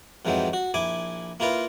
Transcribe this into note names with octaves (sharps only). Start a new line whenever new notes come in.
F2 G#2 E3 F#3 C4
F#4
A#1 E4 G#5 D6
A#3 E4 F4 A#4 B4